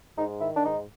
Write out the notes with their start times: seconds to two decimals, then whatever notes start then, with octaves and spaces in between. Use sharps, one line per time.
0.17 G#2 D#4
0.41 D#3 E4
0.57 D4
0.65 G#2 D#4